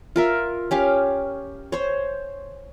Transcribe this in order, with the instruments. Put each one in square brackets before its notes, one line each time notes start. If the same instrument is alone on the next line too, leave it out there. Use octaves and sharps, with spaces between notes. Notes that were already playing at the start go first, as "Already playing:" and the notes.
[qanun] F4 A#4 E5
C#4 G4 F5
C5 C#5